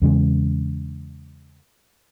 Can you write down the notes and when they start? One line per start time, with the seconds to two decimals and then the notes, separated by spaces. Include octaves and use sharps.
0.02 E2 C#3 G#3